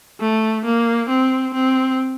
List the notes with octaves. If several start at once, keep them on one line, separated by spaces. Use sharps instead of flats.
A3
A#3
C4
C4